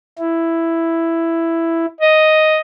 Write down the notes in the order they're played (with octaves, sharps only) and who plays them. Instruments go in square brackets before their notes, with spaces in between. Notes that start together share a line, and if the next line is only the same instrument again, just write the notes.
[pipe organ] E4
[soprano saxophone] D#5